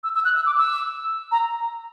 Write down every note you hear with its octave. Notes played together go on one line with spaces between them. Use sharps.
E6
E6
F#6
E6
D6
E6
A#5